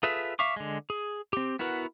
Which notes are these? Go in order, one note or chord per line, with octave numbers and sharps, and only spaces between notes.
F4 G#4 A4 B4 E5
E5 F5 C#6 D6
D3 G#3
G#4
C4 G4
B3 E4 F#4 A#4 B4